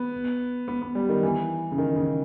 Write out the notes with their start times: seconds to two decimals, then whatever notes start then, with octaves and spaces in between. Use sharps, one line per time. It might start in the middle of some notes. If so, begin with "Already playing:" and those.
Already playing: B3
0.68 B3
0.82 B3
0.95 G3
1.09 D#3
1.23 E3
1.72 C#3
1.78 D#3
1.96 C#3